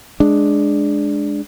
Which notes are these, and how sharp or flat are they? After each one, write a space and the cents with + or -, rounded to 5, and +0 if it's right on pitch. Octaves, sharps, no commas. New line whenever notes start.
G#3 +0 D4 +0